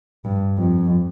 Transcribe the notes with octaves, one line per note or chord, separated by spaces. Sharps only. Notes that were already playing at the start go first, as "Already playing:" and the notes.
G2
F2